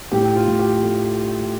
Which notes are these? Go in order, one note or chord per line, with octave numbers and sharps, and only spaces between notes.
A2 G4
F4
A2
G4
A3